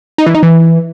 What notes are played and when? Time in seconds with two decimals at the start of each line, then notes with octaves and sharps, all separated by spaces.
0.18 D#4
0.27 E3
0.35 D#4
0.43 E3